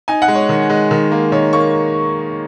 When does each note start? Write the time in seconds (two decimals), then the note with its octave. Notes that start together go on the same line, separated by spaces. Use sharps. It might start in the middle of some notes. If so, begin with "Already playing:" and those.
0.08 D#4 G#5
0.22 F#5
0.28 G#3
0.35 C#5
0.49 D#3
0.70 G#3
0.91 D#3
1.12 A#3
1.32 D#3 C#5
1.53 A#3 C#6